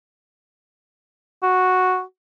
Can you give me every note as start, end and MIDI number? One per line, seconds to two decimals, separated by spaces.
1.43 2.01 66